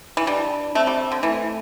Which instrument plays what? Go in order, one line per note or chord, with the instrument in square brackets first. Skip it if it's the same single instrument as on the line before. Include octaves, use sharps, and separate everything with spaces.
[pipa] E3
[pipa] G3 [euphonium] D4
[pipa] A3 [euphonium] C4
[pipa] G3
D3
[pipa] E3 [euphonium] A3